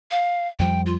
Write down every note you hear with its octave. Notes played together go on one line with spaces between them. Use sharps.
F5
F2 F3 G3 G5
F4